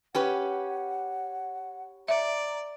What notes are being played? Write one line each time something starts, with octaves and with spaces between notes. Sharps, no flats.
C#4 G4 B4 F#5
D5 E5 A#5